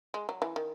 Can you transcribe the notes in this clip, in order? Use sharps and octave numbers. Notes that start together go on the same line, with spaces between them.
G#3
F#3
E3
D#3